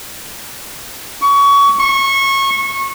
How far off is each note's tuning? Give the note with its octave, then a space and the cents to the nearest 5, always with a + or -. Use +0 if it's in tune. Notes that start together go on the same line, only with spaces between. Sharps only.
C#6 +25
C#6 -25